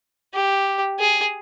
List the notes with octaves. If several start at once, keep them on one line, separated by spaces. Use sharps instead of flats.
G4
G#4